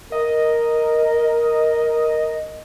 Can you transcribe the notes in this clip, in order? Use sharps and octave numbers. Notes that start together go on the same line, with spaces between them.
A#4 D#5